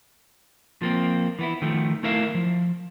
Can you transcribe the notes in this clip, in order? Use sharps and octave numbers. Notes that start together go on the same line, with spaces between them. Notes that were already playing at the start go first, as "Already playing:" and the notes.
F3 A#3 C4
E3 B3 E4
D#3 F3 A3
A3 E4 A#4 E5 F5
F3